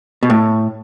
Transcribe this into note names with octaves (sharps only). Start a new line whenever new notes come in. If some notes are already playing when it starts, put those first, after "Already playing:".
B2
A2